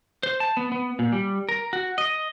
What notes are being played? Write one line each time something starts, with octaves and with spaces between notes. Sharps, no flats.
C5
A5
B3
B3
A#2
G3
A#4
F#4
D#5